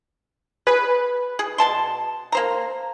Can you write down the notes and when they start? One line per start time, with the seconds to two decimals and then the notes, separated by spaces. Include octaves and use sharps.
0.67 G#4 B4
1.39 G#4
1.58 B2 A5 C6
2.32 A#3 C5 A#5